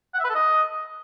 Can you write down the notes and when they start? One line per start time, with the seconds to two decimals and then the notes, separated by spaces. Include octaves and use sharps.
0.14 F#5
0.19 E5
0.24 B4
0.30 A4
0.35 D#5